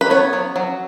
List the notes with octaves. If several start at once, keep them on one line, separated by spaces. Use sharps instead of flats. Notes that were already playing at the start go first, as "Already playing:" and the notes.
B4
B3 C#5
F#3
F#3